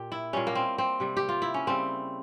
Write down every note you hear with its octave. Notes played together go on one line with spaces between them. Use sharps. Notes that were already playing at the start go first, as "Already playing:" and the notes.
Already playing: A#2 G4
E4
A#2 G3 C#4
A#3
C4
C4
C3 G3
G4
F4
E4
C#4
C#3 G3 C4